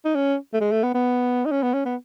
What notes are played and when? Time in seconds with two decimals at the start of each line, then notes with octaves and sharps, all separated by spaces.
0.05 D#4
0.15 C#4
0.54 A3
0.61 G#3
0.71 A3
0.83 B3
0.94 B3
1.46 D#4
1.51 C#4
1.63 B3
1.74 C#4
1.86 B3